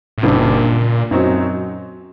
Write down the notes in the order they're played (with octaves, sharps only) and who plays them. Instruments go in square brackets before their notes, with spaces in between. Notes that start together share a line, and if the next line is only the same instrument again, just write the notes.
[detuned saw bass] A2
[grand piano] F#1 F#2 D#3 G3 D4 [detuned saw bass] A#2
[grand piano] F#2 F#3 C4 D#4 F#4